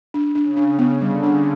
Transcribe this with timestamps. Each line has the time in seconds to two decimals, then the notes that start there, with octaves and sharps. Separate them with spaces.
0.14 D4
0.35 D4
0.43 C#3
0.57 D4
0.72 C#3
0.79 B3
1.01 D3 G3
1.23 D4